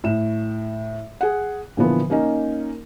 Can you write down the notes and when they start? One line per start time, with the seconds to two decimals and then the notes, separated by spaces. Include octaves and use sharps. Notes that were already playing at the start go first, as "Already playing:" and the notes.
0.04 A2 E7
1.21 G#4 F#5
1.77 A#2 D3 E3 F3 B3
2.10 A#3 C#4 D#4